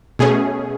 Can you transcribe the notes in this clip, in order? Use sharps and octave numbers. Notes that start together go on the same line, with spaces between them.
B2 A3 C#4 G#4